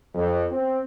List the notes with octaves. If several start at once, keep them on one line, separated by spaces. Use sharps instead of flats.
F2
C4